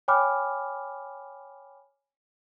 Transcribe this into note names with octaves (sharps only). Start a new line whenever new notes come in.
C#5 G5 G#5 B5 D6 F6